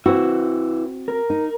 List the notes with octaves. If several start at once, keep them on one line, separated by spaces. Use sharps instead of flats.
C4 E4 F#4 B4 C5
A#4
D#4